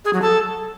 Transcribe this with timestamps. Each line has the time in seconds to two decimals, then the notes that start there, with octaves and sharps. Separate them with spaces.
0.05 G#4
0.13 F#3
0.22 A4